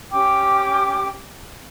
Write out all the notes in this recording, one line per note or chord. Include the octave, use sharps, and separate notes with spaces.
C#4 G4 G5 D6